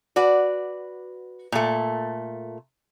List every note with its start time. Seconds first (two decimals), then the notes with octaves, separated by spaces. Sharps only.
0.16 F#4 B4 D5
1.52 A#2 A3